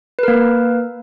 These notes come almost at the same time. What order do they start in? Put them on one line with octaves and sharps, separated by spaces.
B4 A#4 A#3